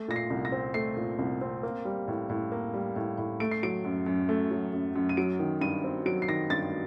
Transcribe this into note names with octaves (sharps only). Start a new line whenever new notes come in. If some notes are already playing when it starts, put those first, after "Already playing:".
Already playing: A3
A#2 A#6
C7
C2
A#6
C4
A3 C7
A#2
C2
C4
A#3
G3
A2
A2
A#3
G3
A2
A2
A3 D7
C7
F#3 D7
F#2
F#2
A3
F#3
F#2
F#2
D#7
F#3 D7
D#3
G2 D#7
C4
F#3 D7
C7
D#3 A#6
G2 A6